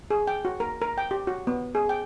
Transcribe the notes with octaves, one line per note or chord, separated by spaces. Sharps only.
G#4
G5
F#4
A#4
A#4
G5
G4
F#4
B3
G#4
G5